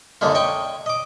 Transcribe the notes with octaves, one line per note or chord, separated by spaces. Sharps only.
F#2 D3 G#3 A#3 F4
C#5 D#5 G5 C#6
D#5 D6